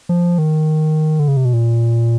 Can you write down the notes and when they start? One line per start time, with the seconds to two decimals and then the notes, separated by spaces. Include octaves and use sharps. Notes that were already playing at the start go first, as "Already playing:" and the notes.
0.09 F3
0.38 D#3
1.20 D3
1.28 C#3
1.37 C3
1.45 B2
1.53 A#2